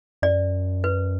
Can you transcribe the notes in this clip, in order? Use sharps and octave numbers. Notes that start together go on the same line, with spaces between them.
F#2 D5
B4